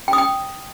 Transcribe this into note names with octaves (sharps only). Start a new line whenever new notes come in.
G5
D#6
G5